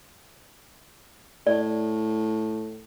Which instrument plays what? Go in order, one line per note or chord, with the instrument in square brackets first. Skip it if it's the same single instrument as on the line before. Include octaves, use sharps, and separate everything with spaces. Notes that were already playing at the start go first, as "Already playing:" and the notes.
[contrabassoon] A2 [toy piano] D5